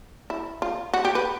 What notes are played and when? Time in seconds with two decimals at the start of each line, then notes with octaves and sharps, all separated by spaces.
0.30 E4
0.62 F4
0.93 F#4
1.05 G4
1.15 B4